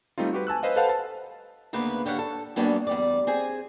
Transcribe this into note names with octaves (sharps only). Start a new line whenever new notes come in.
G3 A3 C4 D#4 F4
F#4 G4 B4
G#5 A5 E6 F#6
B4 C5 D#5 F5
A4 B4 C5 F5 F#5 A5
A5
D2 C#3 A#3 B3 B4
D#2 D3 G4 C#5 F5 F#5
A4
F#3 G3 A#3 B3 C#4 D4
E2 G3 D5
C4 G#4 G#5